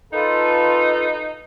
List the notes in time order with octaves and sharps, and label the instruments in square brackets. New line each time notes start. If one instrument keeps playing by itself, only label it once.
[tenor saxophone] D#4 [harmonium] F4 A4 B4